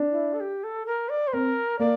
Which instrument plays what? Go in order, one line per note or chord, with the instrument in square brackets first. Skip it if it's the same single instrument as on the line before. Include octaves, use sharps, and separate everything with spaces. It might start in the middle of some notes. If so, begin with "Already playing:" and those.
Already playing: [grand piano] D4
[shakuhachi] E4
A4
G4
A4
A#4
D5
C5
[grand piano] C4 [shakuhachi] A#4
[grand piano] A#3 [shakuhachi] D5